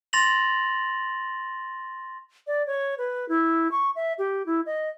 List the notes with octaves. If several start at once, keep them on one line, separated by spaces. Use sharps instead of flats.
C6 A6 A#6 F7 F#7
D5
C#5
B4
E4
C#6
E5
G4
E4
D#5